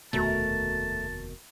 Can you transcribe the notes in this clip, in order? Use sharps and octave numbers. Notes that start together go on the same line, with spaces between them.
F1 D#2 B2 A3 F#4 A#4 A5 A#5